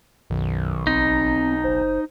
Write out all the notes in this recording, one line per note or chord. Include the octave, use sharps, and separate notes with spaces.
B1 F#2 D#3
A1 C4 D#4
F#1 C5